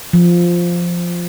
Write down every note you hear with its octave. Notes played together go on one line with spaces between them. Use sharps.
F3